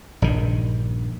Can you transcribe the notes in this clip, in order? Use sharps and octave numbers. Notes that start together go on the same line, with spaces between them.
A#1 G2 D#3